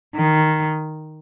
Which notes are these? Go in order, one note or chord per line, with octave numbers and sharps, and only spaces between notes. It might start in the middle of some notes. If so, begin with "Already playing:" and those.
D#3